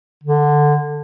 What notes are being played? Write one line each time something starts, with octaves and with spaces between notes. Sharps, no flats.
D3